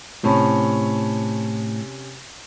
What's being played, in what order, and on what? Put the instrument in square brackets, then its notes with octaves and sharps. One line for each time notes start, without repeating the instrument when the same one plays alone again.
[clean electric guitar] A2 [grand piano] C3 C#4